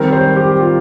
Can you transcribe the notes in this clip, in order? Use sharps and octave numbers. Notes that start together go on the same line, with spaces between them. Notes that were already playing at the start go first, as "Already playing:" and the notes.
Already playing: D#3 G3 C4 A#4
C5
G4
F4